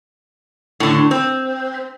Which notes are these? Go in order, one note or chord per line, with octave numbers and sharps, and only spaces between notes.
A2 D3
C4